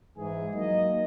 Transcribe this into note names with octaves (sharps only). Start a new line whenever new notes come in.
G#2 E3 G#4
F#3 A#3 D#4 D#5